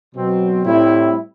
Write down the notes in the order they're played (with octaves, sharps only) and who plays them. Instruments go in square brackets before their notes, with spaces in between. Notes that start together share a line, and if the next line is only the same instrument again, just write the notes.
[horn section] B2 F#3 C4
A2 G3 C4 E4